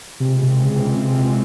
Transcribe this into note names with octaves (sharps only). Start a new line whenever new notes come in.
C3 E3 G#3 C4 F4
C3
C#3
C3
C#3
C3
C3